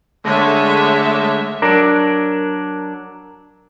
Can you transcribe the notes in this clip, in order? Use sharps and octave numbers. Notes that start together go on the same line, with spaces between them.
D3 G#3 A3 D4 C#5 E5
F#3 D4 A#4